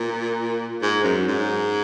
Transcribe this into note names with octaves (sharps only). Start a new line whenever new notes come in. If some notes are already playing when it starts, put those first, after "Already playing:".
Already playing: A#2
G#2
F#2
G#2